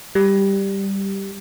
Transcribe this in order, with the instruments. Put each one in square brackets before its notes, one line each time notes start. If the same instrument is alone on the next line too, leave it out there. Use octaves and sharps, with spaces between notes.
[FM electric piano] G3